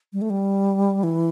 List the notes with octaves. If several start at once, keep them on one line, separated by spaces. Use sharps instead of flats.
G3
A3
G3
E3